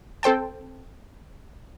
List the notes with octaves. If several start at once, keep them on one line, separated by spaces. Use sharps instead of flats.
C4 A4 C5 G5 A5